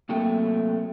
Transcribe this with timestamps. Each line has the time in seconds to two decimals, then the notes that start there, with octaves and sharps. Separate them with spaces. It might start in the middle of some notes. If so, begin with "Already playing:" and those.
0.09 C3 F#3 A3 A#3 G5